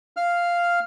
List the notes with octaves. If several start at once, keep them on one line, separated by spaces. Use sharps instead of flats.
F5 F6